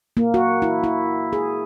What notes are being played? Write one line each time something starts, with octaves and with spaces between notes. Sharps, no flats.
A#3
F#4
E4
E4
G#4